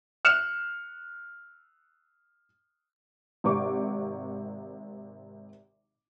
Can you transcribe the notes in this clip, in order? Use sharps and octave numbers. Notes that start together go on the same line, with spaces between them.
F6 F#6 C#7 E7
G#1 C3 C#6 D6